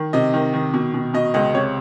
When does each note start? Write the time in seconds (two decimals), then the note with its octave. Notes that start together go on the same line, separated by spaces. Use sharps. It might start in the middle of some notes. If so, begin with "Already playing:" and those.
Already playing: D#3
0.13 C3 D#5
0.34 D#3
0.54 D#3
0.74 B2
0.94 B2
1.14 B2 D#5
1.34 C#2 D#5
1.54 C3 C#5